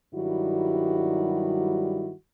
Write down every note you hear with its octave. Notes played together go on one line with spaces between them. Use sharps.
G2 D#3 F#3 G3 E4 F#4